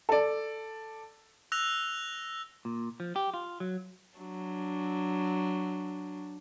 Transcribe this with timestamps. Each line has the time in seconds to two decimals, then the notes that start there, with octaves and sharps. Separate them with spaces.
0.09 A4 D5
1.52 E6 F#6 A#6 F7
2.65 A#2
3.00 F3
3.16 G4
3.34 F4
3.60 F#3
4.17 F#3 D4